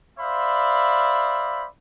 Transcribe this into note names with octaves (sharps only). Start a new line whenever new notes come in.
C5 D5 E5 F5 B5